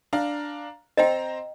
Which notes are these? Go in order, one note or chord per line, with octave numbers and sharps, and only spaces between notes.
D4 F5 A#5
C4 C5 D#5 G5 A#5